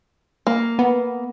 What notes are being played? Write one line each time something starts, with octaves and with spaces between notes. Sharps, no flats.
A#3
B3